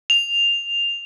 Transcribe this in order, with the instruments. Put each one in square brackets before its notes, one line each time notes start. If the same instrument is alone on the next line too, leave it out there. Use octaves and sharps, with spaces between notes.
[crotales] F7